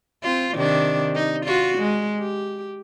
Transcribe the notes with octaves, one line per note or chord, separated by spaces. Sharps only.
C4 F4
C3 D#3 D4
D#4
F4 F#4
G#3
G4